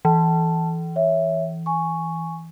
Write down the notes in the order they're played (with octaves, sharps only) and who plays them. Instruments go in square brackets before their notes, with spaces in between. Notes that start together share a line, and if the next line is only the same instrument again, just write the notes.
[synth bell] E3 [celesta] A5
[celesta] C#5 E5
G#5 C#6